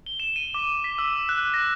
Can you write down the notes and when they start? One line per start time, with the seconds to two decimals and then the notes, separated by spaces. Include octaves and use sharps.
0.06 G7
0.20 E7
0.36 D#7
0.54 D6
0.84 B6
0.98 E6
1.16 E7
1.29 F#6
1.54 A#6